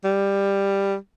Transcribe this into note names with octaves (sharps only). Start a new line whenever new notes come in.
G3